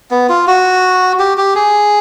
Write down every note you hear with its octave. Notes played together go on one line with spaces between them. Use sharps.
B3
F4
F#4
G4
G4
G#4